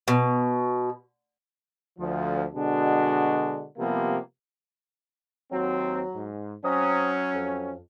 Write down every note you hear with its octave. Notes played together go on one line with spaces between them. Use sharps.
B2
D2 F3
B2 D3 G#3 D4 F#4
C3 F3 G3 A#3 B3
D#2 F#3 C4
G#2
F#3 C4 C#4 A#5 D#6
F2